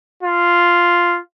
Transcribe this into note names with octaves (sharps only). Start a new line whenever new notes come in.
F4